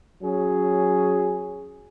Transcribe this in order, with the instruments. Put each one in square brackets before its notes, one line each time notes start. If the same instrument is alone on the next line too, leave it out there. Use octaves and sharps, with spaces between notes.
[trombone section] F#3 C#4 G#4